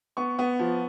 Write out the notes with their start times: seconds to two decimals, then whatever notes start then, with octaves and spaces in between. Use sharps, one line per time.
0.17 B3 C#6
0.39 B3
0.59 F3